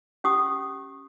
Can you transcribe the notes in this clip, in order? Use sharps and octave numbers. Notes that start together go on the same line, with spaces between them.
C#4 G4 D#6